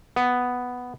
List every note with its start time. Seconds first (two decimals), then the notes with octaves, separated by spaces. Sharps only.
0.16 B3